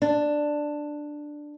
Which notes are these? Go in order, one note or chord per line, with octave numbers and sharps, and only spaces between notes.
D4